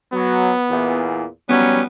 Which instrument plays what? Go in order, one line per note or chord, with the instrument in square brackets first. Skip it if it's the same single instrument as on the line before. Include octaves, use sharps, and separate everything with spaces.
[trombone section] F#3 [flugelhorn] B3
[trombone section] E2 A#2 E3
[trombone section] F#3 C#4 [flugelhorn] G3 [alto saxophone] B3